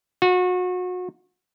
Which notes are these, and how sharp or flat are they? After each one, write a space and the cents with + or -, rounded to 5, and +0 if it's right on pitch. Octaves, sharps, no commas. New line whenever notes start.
F#4 -30